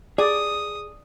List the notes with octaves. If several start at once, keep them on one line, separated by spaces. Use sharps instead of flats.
G#4 D5 D#6